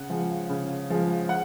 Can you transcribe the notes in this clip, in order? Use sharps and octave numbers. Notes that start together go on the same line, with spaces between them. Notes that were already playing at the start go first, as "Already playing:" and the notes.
Already playing: C#3 F#5
F3 G#3
C#3
F3 G#3
F#5